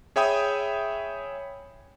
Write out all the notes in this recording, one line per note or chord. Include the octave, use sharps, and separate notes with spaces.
G#4 C#5 E5 G5 B5 D#6